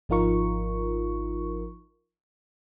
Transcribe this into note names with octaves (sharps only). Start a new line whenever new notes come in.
G#1 F3 D#4 F4 A#4 C#6